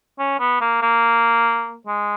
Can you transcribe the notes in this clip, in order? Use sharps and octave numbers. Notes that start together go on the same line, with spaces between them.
C#4
B3
A#3
A#3
G#3